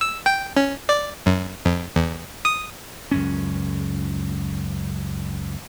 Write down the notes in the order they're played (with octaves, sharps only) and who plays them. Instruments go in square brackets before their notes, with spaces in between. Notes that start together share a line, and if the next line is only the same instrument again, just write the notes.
[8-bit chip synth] E6
G5
C#4
D5
F#2
F2
E2
D#6
[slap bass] C#2 F#2 C#4